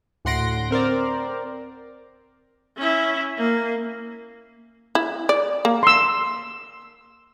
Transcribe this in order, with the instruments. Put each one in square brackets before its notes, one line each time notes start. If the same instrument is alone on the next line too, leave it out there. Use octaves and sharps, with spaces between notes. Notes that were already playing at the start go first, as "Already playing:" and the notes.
[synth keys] D2 A2 F#5 C6 A#6 D7
C4 A#4 C5 D5
[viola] C#4 E4
A#3
[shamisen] E4
D5
A#3
[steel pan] C6 E6